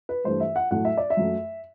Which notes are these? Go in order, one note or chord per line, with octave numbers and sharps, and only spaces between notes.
B4
G2 E3 A3 C5
E5
F#5
A2 F#3 A3 F#5
E5
D5
E5
F#2 F#3 A3